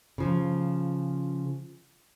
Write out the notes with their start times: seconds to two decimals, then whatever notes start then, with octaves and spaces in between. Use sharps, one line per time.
0.18 C#3 F3